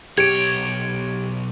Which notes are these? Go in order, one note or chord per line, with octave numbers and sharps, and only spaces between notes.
B1 G4 C#5 G#6 D7